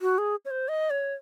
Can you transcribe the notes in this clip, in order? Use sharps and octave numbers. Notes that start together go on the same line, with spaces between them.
F#4
G#4
C#5
C5
D#5
C#5